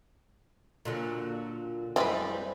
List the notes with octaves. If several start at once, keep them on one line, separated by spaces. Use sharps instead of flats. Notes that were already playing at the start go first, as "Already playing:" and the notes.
A#2 D3 F#3
F#2 E3 G3 G#3 C4 B4